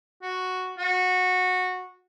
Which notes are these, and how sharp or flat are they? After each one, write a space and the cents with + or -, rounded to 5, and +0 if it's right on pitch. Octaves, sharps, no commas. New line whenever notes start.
F#4 +0
F#4 -15